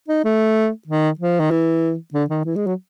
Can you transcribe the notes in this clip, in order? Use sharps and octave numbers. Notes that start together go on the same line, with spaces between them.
D#4
A3
D#3
F3
D#3
E3
D3
D#3
E3
G#3
F#3